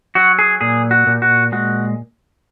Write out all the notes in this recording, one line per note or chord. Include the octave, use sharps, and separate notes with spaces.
F#3 F#4
G#4
A#2 G#4
F#4
A#2
F#4
G#3 F#4